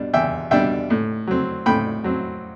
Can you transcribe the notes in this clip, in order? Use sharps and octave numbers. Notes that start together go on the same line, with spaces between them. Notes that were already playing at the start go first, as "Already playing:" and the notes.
Already playing: B2 G3 D4
E2 E5 G5
B2 G3 D4 E5 G5
A2
F#3 C4
A2 G5 B5
F#3 C4